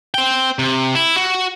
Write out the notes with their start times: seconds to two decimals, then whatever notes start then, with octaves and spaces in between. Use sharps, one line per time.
0.14 C5 G5
0.59 C3
0.95 E4
1.16 F#4